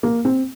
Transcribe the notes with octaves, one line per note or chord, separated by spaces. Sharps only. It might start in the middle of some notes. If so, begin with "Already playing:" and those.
A#3
C4